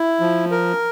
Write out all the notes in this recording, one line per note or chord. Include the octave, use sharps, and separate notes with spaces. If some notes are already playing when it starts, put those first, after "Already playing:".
Already playing: E4
F3
A#4